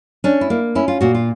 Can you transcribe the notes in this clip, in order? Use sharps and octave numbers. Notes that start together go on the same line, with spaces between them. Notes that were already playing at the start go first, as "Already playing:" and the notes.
C#4 D4
E4
A#3
C#4 E4
F4
A#2 F#4
F4